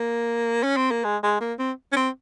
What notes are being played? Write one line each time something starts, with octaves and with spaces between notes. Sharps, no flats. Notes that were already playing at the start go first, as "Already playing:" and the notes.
Already playing: A#3
C#4
C4
A#3
G#3
G#3
A#3
C4
C#4
C4